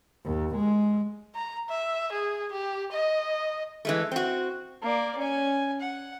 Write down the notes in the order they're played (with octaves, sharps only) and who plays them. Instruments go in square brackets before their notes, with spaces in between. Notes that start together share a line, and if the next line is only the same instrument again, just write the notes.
[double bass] D#2
G#3
[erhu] A#5
E5
G#4
G4
D#5
[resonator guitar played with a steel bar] E3 G#3 A3
C4 F#4
[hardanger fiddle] A#3 D5
C#4 G#5
F#5